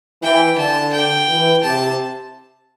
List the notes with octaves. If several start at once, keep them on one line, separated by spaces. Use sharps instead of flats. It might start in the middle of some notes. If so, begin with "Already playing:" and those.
E3 G5
D3 A5
G5
E3
C3 A5